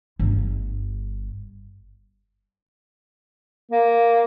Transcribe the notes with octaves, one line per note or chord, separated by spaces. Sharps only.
G1
A#3